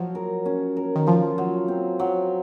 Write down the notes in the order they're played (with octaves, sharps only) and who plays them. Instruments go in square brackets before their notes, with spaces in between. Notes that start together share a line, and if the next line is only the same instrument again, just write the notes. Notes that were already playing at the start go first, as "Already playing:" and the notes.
Already playing: [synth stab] F3 [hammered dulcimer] F#3
[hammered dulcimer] A#4
C#4
A#4
[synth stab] D#3
[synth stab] F3 [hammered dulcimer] F4
[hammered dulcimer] F#3
C4
F#3